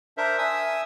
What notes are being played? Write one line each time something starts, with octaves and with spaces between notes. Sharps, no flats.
D4 A#4 C5 E5
E5 G#5 D#6 E6